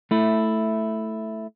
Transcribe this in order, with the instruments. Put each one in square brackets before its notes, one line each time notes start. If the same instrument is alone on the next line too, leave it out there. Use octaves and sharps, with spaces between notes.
[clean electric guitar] A3 E4